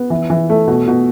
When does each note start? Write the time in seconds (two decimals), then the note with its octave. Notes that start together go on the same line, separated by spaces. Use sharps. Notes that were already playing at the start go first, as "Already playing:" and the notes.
Already playing: B3
0.10 E3
0.30 E3
0.50 A3
0.68 B2
0.87 B2